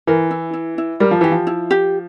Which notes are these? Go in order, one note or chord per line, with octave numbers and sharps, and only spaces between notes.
E3 A#4
E4
E4
E4
G3 A#4
F3
E3 G4
F3
E4
G4